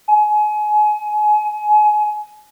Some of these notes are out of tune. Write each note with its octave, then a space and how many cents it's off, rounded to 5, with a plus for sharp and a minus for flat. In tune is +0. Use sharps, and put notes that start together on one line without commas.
G#5 +30